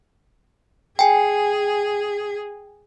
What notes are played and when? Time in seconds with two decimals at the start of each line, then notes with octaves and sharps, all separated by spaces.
0.99 G#4 G5 G#5